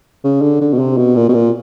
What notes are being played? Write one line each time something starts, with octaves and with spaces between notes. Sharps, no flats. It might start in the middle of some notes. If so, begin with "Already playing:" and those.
C#3
D3
D3
B2
C3
B2
A#2
B2
A#2